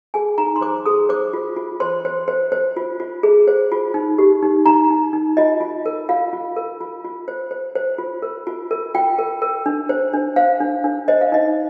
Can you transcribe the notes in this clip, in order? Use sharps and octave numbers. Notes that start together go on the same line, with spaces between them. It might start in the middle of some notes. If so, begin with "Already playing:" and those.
G#4 G#5
D#4 A#5
C6
C5 D6
G#4 D#6
C5 D6
F4
F4
C5 C6
C5
C5
C5
F4
F4
G#4
C5
F4
D#4
G4
D#4
D#4 A#5
D#4
D#4
F4 D#5
F4
A#4
F4 F5
F4
A#4
F4
F4
C5
C5
C5
F4
A#4
F4
A#4
F4 G5
A#4
A#4
D4
C5
D4
C5 F5
D4
D4
C5 D#5
F5
D#4 D#5